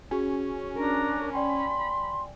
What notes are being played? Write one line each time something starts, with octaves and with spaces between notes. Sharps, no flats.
C#4 F#4 G#4
D4 A#4 A#5
D5 G5 G#5 B5 C6